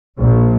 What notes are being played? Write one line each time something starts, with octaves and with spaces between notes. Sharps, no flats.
A#1